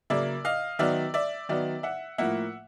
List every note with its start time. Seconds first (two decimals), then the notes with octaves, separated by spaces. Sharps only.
0.10 C#3 F#3 A#3 D5 E5
0.45 D#5 F5
0.79 D#3 F#3 B3 D5 E5
1.14 D5 E5
1.49 D#3 F#3 B3 D5 E5
1.83 E5 F#5
2.18 A2 F3 A#3 E5 F#5